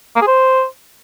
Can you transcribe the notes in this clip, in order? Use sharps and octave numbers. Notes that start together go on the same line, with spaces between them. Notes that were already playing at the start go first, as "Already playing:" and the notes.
A#3
G#4
C5